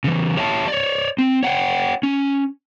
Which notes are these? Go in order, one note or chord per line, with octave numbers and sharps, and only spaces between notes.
C#3 E3
G4 C#5 E5 G5 A5
C#5 D5
C4
C#5 F#5 G5
C#4